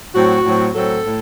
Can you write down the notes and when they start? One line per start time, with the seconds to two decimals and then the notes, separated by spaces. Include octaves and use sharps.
0.14 A2 F#3 C4 F#4
0.45 A2 F#3 C4
0.75 A2 F#3 C4 A4
1.06 A2